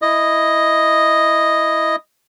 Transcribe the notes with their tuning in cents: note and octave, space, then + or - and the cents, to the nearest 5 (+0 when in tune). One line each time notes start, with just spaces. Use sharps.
E4 +0 D#5 +0